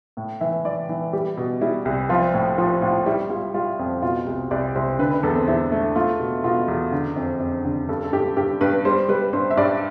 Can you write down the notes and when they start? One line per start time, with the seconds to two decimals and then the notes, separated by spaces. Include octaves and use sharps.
0.17 A2
0.41 E3 E5
0.65 E3 D5
0.89 E3
1.13 G3 G4
1.37 B2
1.61 G3 E4
1.85 C2
2.09 F3 F4
2.34 A2
2.58 F3 F4
2.82 A2 F4
3.06 G3 E4
3.30 G3 F4
3.54 G3 F4
3.79 F2
4.02 B2 F4
4.26 C2
4.51 C2 D5
4.75 C2 C5
4.99 D3 B4
5.11 B4
5.23 E2 A4
5.36 C4
5.48 E2 E4
5.72 A3
5.96 A3 F4
6.20 B2
6.44 B2 F4
6.68 E2
6.92 D3
7.16 F2
7.40 F2
7.65 D3
7.89 G2 A4
8.03 A4
8.13 G2 G4
8.37 G2 G4
8.61 G2 B4
8.85 G3 C5
9.09 G3 B4
9.33 G2 C5
9.50 E5
9.57 G2 D5